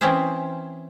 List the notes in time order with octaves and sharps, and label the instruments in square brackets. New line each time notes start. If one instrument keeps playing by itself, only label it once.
[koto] E3 C4 C#4 E4 G#4 C5